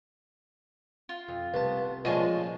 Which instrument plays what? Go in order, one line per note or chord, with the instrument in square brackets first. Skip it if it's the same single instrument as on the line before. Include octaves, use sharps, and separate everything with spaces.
[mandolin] F4
[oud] F2
[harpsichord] C2 A5 [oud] B3
[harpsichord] A#2 F3 C#4 [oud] G#3 F4 [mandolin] D#5 G#5 A5